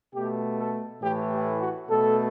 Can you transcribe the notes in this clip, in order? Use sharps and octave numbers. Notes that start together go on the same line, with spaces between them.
B2 A3 G4
A4
A2 E3 A3 G4
G4
F#4
B2 A3 A4